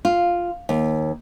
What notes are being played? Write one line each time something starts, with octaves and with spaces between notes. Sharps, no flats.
F4
D#2